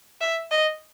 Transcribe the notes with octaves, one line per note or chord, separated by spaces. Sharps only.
E5
D#5